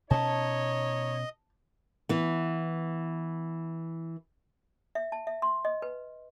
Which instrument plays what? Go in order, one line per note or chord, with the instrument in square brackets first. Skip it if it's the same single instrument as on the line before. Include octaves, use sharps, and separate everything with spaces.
[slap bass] B2 C#4 [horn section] D#4 C#5 [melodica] D#5 [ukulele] A5
[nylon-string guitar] E3 B3
[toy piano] E5
A5
E5
C6
D#5
B4